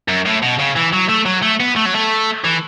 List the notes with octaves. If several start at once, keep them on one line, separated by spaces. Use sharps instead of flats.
F#2
A2
B2
C#3
E3
F#3
A3
F#3
A3
B3
A3
F#3
A3
E3